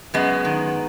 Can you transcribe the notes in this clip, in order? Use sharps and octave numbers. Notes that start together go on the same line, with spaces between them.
F#2 G#3 B3
D#3